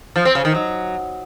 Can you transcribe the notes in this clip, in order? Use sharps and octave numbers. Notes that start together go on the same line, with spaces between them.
F3
C4
C#3
D#3
F#3